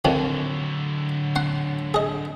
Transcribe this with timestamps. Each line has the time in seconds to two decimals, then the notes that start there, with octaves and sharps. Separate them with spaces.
0.05 F2 D3 D#3 F#3 F4
1.36 F#5 C6
1.94 G#4 D#5